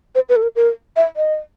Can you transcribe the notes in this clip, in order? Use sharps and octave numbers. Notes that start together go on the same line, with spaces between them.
C5
B4
A4
A#4
A#4
E5
D#5